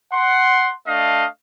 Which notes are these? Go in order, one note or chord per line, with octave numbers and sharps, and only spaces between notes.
F#5 C6
A3 D4 D#5 F5